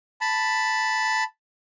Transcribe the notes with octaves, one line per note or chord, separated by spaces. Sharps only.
A5 B5